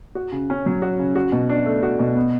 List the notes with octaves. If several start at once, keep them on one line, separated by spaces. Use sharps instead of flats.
F#4
C#3
C#4
F#3
F#4
C#3
F#4
B2
D4
A3
F#4
B2
B3